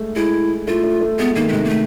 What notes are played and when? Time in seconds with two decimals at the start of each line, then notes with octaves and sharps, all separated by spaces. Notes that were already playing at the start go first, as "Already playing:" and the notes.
Already playing: G#3 A3
0.16 G#3 E4
0.67 A3 F4
0.84 A3
1.01 A3
1.19 G#3 B3
1.36 D#3 A#3
1.48 A3
1.52 C3 G#3
1.65 A#3
1.70 A3